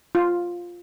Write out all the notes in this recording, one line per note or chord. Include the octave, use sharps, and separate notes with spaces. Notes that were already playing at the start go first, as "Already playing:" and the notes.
F4